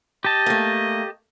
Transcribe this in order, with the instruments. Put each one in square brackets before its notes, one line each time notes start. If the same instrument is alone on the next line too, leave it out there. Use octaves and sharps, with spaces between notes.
[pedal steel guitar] G4 A5 [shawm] D#5
[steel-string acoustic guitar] A3 A#3